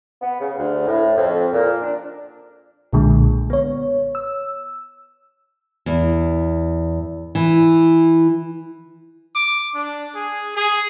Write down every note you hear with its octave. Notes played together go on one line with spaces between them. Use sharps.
B3
C#3
D2
A2
F2
A#2
D4
B1 A#2 D3 G#3
B3 C#5
E6
E2
E3
D6
D4
G#4
G#4